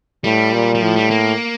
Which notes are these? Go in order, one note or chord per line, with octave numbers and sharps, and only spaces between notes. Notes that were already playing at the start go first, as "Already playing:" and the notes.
A2 G3
A#2
G3
A2 F3
G3
A#3